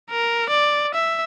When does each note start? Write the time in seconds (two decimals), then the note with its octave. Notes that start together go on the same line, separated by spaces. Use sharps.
0.10 A#4
0.49 D5
0.95 E5